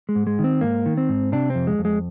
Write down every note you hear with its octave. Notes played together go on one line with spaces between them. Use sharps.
G#3
G#2
G#3
D#3
C4
G#2 A#3
D#3
C4
G#2
C3 D4
F2 C4
G#3
F2
G#3